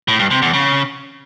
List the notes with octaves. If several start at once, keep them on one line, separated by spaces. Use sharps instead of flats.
A2
G2
C3
E2
C#3